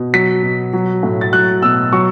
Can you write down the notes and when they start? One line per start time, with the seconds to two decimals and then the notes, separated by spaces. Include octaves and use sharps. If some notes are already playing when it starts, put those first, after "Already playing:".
Already playing: B2
0.14 F#3 B6
0.43 B2
0.73 F#3
1.03 A2
1.21 A6
1.33 F#3 F#6
1.62 B2 E6
1.92 F#3 C#6